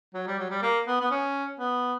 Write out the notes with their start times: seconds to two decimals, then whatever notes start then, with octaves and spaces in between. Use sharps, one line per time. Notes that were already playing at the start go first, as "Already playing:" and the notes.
0.14 F#3
0.27 G3
0.39 F#3
0.51 G3
0.62 A#3
0.87 B3
1.00 B3
1.11 C#4
1.60 B3